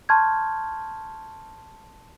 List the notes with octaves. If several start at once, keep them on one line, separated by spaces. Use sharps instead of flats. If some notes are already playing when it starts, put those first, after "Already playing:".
A5 C6 C#6 F6 G6 G#6